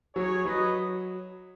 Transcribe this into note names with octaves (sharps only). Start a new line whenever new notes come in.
F#3 G#4 C#5
F#3 B4 D#5